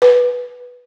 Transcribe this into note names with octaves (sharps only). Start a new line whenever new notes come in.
B4